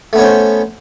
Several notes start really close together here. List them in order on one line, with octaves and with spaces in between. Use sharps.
A3 B3 C#5 C#4 C5